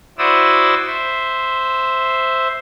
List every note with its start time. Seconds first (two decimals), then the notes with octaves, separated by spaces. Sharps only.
0.18 E4 F#4 C5 D5 D#6 E6
0.87 C5 E5